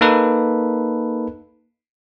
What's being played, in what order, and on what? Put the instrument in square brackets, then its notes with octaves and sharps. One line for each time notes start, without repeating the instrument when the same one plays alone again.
[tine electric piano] A#3 D#4 A4 B4